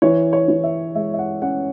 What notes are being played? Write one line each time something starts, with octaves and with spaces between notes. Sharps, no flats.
E3 C#5
C#5
E3
E5
G#3 E5
E5
F#5
C#4 F#5